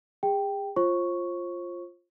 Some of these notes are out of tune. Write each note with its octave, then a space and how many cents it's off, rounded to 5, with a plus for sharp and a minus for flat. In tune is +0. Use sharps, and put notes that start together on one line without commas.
G#4 -40 G5 +0
F4 +0 C5 +40 C#6 +0